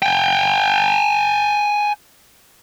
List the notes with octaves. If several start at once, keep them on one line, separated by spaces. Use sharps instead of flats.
G5 G#5